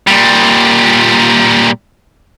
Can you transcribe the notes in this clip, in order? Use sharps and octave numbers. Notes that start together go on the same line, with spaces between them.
A#2 G3